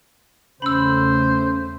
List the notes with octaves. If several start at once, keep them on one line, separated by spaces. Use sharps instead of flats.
E2 C#3 A3 C#4 C5 B5 E6